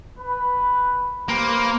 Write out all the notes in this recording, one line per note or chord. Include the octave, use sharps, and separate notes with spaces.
B4
A#3 G4 B4 C5